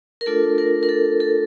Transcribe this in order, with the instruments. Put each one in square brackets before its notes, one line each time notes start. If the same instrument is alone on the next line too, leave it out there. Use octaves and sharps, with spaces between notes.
[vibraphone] A#4
A3 D4 F4 A4
A#4
A#4
A4
A4